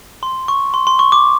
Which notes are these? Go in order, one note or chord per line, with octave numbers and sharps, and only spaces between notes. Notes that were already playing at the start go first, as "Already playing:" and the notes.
C6
C#6
C6
C6
C#6
D6